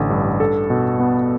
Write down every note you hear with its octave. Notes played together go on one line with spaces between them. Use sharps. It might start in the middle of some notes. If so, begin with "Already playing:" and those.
Already playing: A1 D3
G2
A4
B2
B3